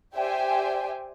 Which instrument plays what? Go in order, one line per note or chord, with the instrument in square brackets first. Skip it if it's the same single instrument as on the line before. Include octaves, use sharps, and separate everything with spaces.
[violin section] G4 C5 D5 E5 G5 G#5